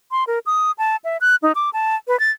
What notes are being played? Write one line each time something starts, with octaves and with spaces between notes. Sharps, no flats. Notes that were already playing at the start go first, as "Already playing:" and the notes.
C6
A#4
D#6
A5
E5
F#6
D#4
D6
A5
B4
A6